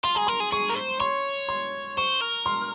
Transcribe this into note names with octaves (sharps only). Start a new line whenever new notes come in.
F4 C6
G#4 A#5
A#4 C6
G#4
G#4 C#6
A#4
C5
C#5 C6
C6
C5 C#6
A#4
C6